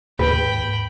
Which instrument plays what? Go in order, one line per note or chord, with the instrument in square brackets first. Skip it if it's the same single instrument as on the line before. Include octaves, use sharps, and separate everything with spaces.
[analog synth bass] D#2 [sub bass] G#2 [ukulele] B4 [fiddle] G5 B5